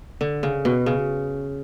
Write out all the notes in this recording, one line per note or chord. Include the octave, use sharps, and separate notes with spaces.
D3
C#3
B2
C#3